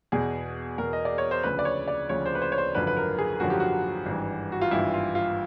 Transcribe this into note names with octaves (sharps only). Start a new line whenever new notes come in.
E2 B2 G#4
E2 B2 A#4
D#5
D5
C#5
C5
D2 C#3 F3 B4
D5
C#5
D5
D2 C#3 F3 C#5
C5
B4
C5
C#5
C5
G#1 F#2 D3 F3 B4
B4
A#4
G#4
G#1 F#2 D3 F3 F#4
G4
F#4
G#1 G2 E3
F#4
F4
G#1 G2 E3 E4
F4
F4